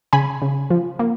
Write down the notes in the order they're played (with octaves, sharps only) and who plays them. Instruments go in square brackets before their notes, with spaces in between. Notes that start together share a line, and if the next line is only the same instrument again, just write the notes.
[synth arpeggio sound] C#3 G#5 B5
C#3
F3
A#3